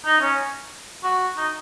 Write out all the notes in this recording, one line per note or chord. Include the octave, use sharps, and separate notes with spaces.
D#4
C#4
F#4
D#4